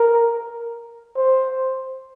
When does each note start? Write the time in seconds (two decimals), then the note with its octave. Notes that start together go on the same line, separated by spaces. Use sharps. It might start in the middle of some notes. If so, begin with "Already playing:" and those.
Already playing: A#4
1.16 C5